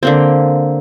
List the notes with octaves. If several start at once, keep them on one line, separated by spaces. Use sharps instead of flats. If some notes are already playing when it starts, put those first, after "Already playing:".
D3 A#3 C4